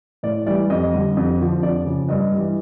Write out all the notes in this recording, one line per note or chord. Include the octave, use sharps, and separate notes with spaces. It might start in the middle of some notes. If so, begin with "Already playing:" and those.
A2 D5
E3 G3 D5
F2 D#5
D3 G3
F2
D3 F3
F2 D5
C#3 F3
G2 D#5
G3
E3